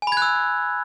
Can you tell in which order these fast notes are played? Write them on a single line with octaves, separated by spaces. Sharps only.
G#5 B5 G#6 F#6 E6